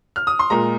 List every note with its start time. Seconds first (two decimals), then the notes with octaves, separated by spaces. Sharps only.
0.16 F6
0.27 D#6
0.39 C6
0.50 A#2 G#3 A#5